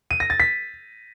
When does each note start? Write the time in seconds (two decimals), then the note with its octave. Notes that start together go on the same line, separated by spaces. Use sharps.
0.11 D#7
0.20 A#6
0.30 A6
0.40 B6